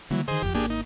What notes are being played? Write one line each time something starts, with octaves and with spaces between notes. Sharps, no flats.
D3 E3 F#3 G3 A#3
D3 D#3 G#4 C5 D#5
F#1 F2 G4
G#1 A#3 D4 G4 G#4
D#4